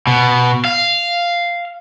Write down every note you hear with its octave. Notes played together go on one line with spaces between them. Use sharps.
B2
F5